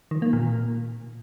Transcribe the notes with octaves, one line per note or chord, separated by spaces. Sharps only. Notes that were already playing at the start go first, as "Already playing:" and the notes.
D#3
A#3
A#2